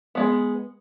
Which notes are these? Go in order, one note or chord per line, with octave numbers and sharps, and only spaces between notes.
G#3 B3